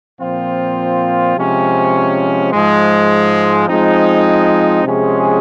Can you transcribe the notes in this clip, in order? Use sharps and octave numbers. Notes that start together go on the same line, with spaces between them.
A#2 F3 C4 F4
C3 F3 G#3 C#4
G#2 F3 G#3
F3 G#3 C4 D#4
C3 F3 G#3 C#4 G#4